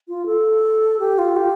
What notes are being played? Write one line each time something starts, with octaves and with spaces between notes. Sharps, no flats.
F4
A4
G4
F4
G4